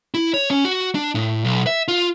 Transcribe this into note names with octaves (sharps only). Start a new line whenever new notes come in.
E4
C#5
C#4
F#4
D4
A2
B1
E5
F4